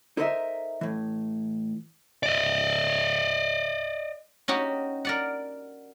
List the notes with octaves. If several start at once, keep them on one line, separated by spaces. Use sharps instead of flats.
D#4 A4 A#4 C5 D#5 E5
A2 E3
D5 D#5
C#4 D#4 F#4 G4
A#4 D5 F#5